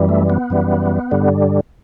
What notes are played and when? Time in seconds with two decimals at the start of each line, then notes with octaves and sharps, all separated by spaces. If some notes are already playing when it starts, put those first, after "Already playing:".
Already playing: F#2 E3 G3
0.09 A3
0.30 B3
0.50 F#2 E3 G3
1.11 G2 D3 G3